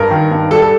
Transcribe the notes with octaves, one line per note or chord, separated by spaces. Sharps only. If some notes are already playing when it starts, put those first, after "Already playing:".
Already playing: G2 A#4
D#3
G2
G3 A4
A4